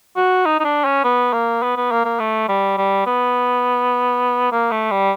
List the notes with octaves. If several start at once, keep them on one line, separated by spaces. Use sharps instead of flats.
F#4
D#4
D#4
D4
C#4
B3
A#3
B3
B3
A#3
A#3
A3
G3
G3
B3
A#3
A3
G3